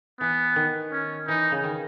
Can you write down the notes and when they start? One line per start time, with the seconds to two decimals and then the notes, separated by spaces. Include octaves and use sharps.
0.20 E3 B3
0.56 D#3
0.92 C#4
1.27 E3 D#4
1.52 C#3
1.64 D#3